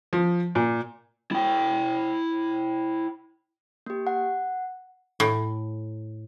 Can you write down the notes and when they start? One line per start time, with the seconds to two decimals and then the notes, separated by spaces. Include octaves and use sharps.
0.13 F3
0.55 A#2
1.31 E4 G5
3.86 A#3 G4
4.07 F#5
5.20 A2